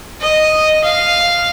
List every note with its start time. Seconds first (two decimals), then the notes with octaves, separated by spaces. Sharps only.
0.21 D#5
0.83 F5